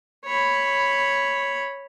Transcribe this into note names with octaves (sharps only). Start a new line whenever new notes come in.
C#5 B5